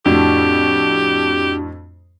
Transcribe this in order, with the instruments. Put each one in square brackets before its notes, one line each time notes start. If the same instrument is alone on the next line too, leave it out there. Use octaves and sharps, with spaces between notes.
[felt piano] F2 A2 [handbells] D4 F#4 [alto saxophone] G4